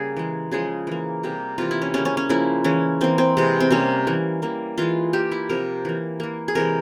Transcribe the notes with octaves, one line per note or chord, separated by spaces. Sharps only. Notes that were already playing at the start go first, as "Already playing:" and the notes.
Already playing: C#3 G3 A#3 G#4
E3 G#3
C#3 F3 G#3 G#4
E3 A#3
C3 G3 A#3
C3 E3 A#3 F4
E4
C#4
C#3 G3 A#3 C#4
C#4
C#4
C#3 F3 A#3 E4
E3 G#3 C#4
E3 A#3 C4
C4
C3 E3 G#3
C4
C3 G3 A#3 C#4
E3 A#3
E3 G3 A#3
E3 G#3 F4
E3 A#3 G4
E4
C3 F3 A#3 A#4
E3 A#3
E3 A#3
G#4
C3 E3 G#3 A#4